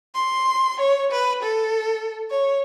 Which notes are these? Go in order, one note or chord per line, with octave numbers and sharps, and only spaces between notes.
C6
C#5
B4
A4
C#5